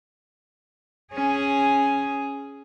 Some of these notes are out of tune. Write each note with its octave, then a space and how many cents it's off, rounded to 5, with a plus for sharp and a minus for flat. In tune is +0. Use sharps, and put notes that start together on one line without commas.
C#4 +0 G#4 +0